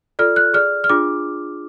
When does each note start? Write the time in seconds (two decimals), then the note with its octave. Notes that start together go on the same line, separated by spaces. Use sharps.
0.19 F4 A4 D5 F6
0.36 F#6
0.54 G#4 D5 F6
0.84 F6
0.89 D4 F4 G#4 D6